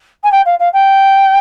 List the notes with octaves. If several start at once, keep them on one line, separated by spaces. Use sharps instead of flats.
G#5
G5
F5
F5
G5